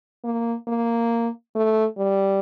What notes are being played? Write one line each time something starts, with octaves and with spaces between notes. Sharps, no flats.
A#3
A#3
A3
G3